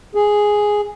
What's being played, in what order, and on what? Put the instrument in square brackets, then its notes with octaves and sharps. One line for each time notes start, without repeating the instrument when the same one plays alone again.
[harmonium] G#4